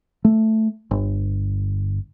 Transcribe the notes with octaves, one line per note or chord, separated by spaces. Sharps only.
A3
G1